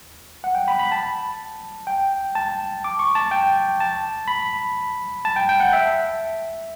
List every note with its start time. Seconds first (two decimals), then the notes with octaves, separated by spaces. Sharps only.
0.44 F#5
0.55 G5
0.68 B5
0.79 B5
0.92 A5
1.87 G5
2.35 A5
2.84 D6
2.99 C#6
3.15 A5
3.31 G5
3.80 A5
4.28 B5
5.25 A5
5.36 G5
5.49 G5
5.60 F#5
5.73 E5